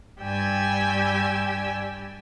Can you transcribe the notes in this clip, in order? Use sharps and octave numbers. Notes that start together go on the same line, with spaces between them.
G2 G4 D5 G5 G#5 E6